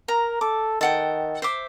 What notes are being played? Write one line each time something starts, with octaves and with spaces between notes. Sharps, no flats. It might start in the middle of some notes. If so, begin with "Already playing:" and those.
A#4 A#5
A4 D6
D#3 A4 F#5 G5
C5 E5 D6